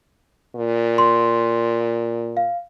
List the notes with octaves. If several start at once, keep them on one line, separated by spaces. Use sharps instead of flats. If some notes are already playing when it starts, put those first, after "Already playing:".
A#2
C6
F5